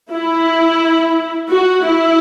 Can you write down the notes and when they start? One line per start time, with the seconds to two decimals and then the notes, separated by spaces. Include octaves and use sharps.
0.10 E4
1.50 F#4
1.85 E4